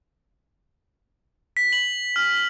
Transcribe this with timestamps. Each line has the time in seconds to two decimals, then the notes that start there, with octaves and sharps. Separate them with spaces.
1.57 B6
1.73 F#7
2.16 F6